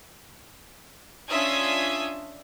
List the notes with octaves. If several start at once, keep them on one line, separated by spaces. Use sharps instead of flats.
C#4 D4 F4 E5 D#6 G#6